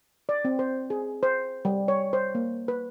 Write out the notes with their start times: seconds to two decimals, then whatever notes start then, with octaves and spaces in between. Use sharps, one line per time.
0.29 D5
0.45 C4
0.59 C5
0.90 G#4
1.23 C5
1.65 G3
1.88 C#5
2.13 C5
2.35 A#3
2.68 B4